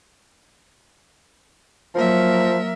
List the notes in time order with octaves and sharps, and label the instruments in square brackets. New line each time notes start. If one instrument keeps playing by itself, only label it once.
[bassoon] F3 [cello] F#3 A#3 [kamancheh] A#4 E5